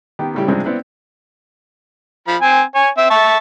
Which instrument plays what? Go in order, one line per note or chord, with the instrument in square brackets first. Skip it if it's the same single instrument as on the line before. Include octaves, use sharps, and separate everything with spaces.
[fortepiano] D#3 B3 G4
A2 C#3 G3 E4 G4
G2 C3 F3 G#3 C4 D4
B3 C4 E4 B4 D5
[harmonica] F3 B5
C4 G#5
C#5 G#5
C4 E5
E5 A5 C#6